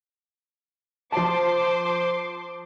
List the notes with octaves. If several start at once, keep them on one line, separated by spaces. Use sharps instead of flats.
F3 C5 A5 C6 D6